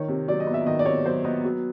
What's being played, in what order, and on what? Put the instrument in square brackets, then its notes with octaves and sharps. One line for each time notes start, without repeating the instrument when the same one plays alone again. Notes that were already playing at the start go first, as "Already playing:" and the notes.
Already playing: [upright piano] D#3 C#5
C3
F#3 D5
D#5
B3
E5
D#3 D#5
D5
C3 C#5
F#3 C5
B3 D#5
F#3